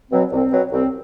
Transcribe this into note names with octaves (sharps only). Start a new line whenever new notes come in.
B2 F#3 C4
C2 C4
B2 F#3
C2 C4